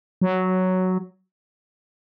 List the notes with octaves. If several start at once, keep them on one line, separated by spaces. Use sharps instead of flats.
F#3